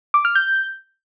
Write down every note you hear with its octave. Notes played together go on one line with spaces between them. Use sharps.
D6
F6
G6